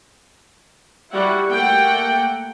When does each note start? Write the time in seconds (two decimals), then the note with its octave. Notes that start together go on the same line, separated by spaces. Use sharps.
1.11 G3 E4 F#4 F#5
1.50 A3 A#3 F#5 G5